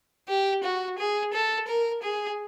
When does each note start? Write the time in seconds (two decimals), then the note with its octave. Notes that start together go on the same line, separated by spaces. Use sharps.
0.28 G4
0.64 F#4
0.98 G#4
1.33 A4
1.67 A#4
2.03 G#4